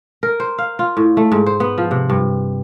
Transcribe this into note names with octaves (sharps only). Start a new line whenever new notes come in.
A#4
C5
F5
F4
A2
A3
G#2
C5
B3
F3
C3
G2